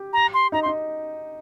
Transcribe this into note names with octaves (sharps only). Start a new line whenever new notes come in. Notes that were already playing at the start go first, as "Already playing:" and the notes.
Already playing: G4
A#5
C6
D#4 A#5
C6
D#4